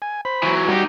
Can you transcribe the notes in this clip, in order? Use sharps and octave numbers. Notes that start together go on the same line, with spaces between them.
G#5
C5 B5
E3 F#3
G3 D#4 F#4 G4